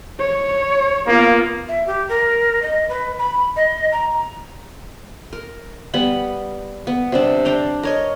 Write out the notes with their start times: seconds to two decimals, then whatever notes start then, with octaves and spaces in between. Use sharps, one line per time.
0.19 C#5
1.07 A#3 B3 F4
1.68 E5
1.87 G4
2.09 A#4
2.62 D#5
2.89 B4
3.19 B5
3.56 D#5
3.92 A#5
5.33 A#4
5.94 G3 B3 B5
6.87 B3
7.12 C3 G3 D4
7.45 D4 G5 A#5
7.83 A#4 C#5 D#5